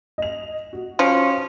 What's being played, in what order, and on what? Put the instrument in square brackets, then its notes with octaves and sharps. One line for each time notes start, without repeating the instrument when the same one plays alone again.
[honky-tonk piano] D#5 F7
F#4
[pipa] F3 [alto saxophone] C#4